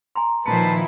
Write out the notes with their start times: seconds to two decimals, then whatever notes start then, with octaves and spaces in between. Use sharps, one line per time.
0.16 G#5 A#5 C6
0.46 A#2 D#3 F3 E4 B4 C5 A5 C#7